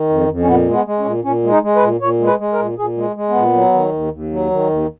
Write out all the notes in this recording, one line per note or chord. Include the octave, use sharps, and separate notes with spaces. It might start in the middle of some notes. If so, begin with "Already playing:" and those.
Already playing: D#3
F2
F2
C#4
A#2 B3
G#3
B3
G#3
C#4
A#2
A#2 C#4
G#3
D#4
G#3
B4
A#2
A#2 C#5
G#3
B4
G#3
A#4
A#2
A#2 G#4
G#3
G#3
B3
A#2
F#3
D#3
D#2
D#2
F#3
D#3
D#2